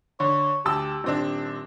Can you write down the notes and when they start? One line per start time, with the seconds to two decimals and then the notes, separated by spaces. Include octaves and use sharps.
0.20 D3 C#5
0.65 D2 G4 A5 E6
1.04 D#1 C4 D4 G4